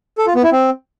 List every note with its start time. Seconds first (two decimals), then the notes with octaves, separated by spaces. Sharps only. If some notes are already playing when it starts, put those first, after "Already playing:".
0.18 A4
0.26 F4
0.35 B3
0.43 E4
0.52 C4